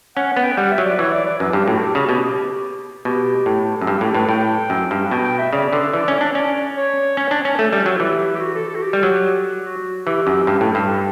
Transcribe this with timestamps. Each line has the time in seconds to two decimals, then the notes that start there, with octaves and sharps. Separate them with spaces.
0.16 C#4 F#5
0.30 F#5
0.37 B3
0.43 G5
0.57 G3 F#5
0.71 E5
0.78 F#3
0.85 D5
0.99 E3 C#5
1.13 D5
1.26 D5
1.40 F#2 B4
1.53 G2 G4
1.67 A2 F#4
1.81 G4
1.95 C#3 F#4
2.08 B2 G4
2.23 G4
3.05 B2 G4
3.46 A2
3.81 F#2
3.87 G2 G4
4.01 A2 G4
4.15 A2 B4
4.29 A2 G5
4.70 F#2
4.91 G2
5.11 B2 G5
5.25 G5
5.38 E5
5.52 C#3 D5
5.73 D3
5.93 E3 D5
6.08 C#4
6.21 D4
6.34 C#4 D5
6.77 C#5
7.17 C#4
7.31 D4
7.45 C#4
7.59 A3 A4
7.73 G3
7.86 F#3
8.00 E3 G4
8.35 G4
8.41 F#4
8.55 A4
8.69 A4
8.76 F#4
8.82 G4
8.93 G3
9.03 F#3
9.65 F#4
10.06 E3 G4
10.27 F#2
10.47 G2
10.61 A2
10.75 G2
10.89 A4